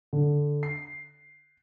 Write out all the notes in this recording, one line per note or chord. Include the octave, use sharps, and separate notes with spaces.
D3
C7